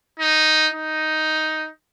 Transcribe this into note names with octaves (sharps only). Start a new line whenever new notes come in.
D#4
D#4